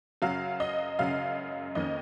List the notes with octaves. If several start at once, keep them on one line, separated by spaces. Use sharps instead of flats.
F#2 C#3 F#3 F5
D#5
F#2 C#3 F#3 F5
F2 D#3 A#3 C#4 D#5